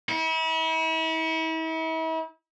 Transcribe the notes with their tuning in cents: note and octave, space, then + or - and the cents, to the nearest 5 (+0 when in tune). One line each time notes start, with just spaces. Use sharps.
E4 -40